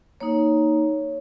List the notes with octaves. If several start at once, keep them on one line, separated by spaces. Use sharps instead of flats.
A#3 D#4 C#5